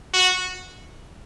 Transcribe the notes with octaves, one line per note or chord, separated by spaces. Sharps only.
F#4